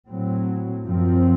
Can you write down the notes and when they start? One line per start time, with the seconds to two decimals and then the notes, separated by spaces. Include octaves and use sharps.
0.10 A2 F#3 C4
0.88 F#2 F3 C4